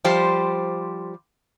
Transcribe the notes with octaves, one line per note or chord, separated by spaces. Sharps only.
F3 G3 G4 C5